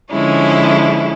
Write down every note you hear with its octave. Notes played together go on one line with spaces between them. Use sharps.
D3 F3 G#3 C#4 E4